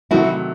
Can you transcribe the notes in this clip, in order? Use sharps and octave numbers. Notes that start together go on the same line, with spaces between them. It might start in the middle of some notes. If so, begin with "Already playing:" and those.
C3 D#3 F#3 A3 E4 F#4